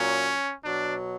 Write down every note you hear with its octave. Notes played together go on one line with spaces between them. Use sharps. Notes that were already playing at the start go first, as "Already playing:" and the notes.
Already playing: A#2 F#3 C#4
B2 F#3 D4